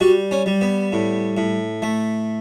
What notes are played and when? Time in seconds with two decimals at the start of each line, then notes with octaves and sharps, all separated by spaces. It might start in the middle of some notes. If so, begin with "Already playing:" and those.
0.01 G3 F#4
0.31 C#4
0.46 G3
0.61 B3
0.92 A2
1.37 A2
1.82 A3